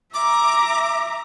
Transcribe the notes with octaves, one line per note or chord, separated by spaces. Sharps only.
E5 A#5 D6